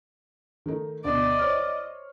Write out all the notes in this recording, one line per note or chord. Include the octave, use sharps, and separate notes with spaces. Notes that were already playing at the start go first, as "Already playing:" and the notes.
D#3 A3 D#4
D2 B2 D5 D#5
C5 C#5 F6